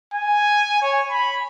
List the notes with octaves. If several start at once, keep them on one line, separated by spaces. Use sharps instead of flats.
G#5
C#5
B5